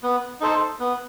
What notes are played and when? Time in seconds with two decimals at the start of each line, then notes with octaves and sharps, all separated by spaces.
0.03 B3
0.41 D#4 A4 C5
0.80 B3